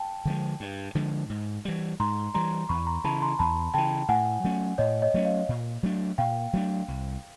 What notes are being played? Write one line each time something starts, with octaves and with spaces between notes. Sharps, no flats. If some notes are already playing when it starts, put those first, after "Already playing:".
Already playing: G5 A5
D3 F3 G#3
G2
D3 F3 G#3
G#2
E3 G3
G#2 A#5 C6
E3 G3 A#5 C6
E2 B5 C#6
A#5 C6
C#3 E3 A5 B5
A#5 C6
E2 A5 B5
C#3 E3 G5 A5
A2 F#5 G#5
F#3 A3 C#4
A2 C#5 D#5
C#5 D#5
F#3 A3 C#4
D#5 F5
A#2
F#3 A3 D4
A#2 F5 G5
F#3 A3 D4
C2